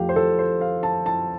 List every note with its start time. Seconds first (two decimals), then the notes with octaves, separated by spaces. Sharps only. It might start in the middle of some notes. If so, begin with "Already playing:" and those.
Already playing: F2 F3 A3 G4 F5
0.09 C5
0.16 A4
0.39 C5
0.61 F5
0.83 A5
1.06 A5